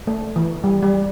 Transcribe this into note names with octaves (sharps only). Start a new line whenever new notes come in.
A3
E3
G3
G3